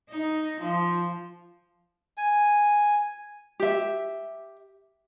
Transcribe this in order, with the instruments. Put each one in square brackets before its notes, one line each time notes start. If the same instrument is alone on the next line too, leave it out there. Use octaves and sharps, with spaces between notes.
[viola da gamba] D#4
F3
[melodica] G#5
[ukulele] G4 E5